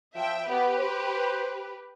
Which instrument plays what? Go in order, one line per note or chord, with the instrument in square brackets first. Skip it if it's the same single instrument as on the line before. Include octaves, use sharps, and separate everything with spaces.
[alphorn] F3 [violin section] E5 G5
[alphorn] B3 [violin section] G4 B4
[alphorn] C5